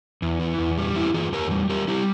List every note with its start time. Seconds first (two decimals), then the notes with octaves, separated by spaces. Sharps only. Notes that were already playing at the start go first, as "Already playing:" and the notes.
0.22 E2
0.40 E3
0.59 E2
0.78 G3
0.96 E2 E4 G4
1.14 E3 F4 G#4
1.32 E2 G4 A#4
1.51 G3
1.70 G3 G4 A#4
1.88 G3 E4 G4